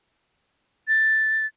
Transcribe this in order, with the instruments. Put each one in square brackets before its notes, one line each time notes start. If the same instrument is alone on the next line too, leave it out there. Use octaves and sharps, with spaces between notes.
[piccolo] A6